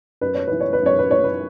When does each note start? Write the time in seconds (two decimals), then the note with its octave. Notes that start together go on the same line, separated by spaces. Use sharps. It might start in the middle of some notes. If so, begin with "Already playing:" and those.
0.21 F#2 B4
0.34 C#5
0.47 E3 B4
0.60 C#5
0.73 B4
0.82 F#2 C#5
0.99 B4
1.11 E3 C#5
1.24 B4